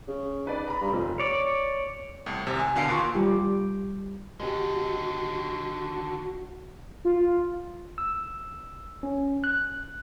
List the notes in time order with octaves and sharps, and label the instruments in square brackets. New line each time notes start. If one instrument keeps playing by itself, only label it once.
[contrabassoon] C#3
[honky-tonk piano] D#4 B4 D5
A#5 B5
[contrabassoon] G2
[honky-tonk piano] F1 [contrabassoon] F2
[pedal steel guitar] C#5 D5
[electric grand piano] C2 A2
G#1 C3
G#5
B2 D3 A4 F5 C7 D7
D#2 A#2 C6 C#6
[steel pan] G3 F4 G4
[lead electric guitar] D3 D#3 [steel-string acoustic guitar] G#3 G4 [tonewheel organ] F#4
[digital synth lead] F4
[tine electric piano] E6
C#4
F#6